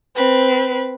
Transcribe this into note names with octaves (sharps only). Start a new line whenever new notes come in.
C4 B4